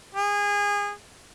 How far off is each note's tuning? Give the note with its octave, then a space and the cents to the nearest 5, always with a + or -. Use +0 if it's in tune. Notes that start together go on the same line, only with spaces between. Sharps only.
G#4 -25